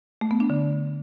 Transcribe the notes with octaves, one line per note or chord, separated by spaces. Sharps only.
A3
B3
D4
D3